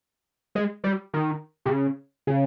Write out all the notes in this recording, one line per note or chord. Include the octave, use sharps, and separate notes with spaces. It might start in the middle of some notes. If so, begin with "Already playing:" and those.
G#3
G3
D#3
C3
C#3
C#3